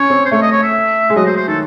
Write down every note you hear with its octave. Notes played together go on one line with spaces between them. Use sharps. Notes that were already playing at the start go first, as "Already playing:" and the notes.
Already playing: C#4 C#5
C4
C5
A3 C#5
D#5
C#5
E5
G#3
F#3 D#5
C5
C5
D#3 A4